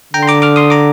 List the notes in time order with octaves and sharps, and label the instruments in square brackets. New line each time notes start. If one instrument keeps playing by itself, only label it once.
[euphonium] D3 [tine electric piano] G5 A#5
[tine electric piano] C6
A#5 D6
D6 F6
C6 D#6
A#5 D6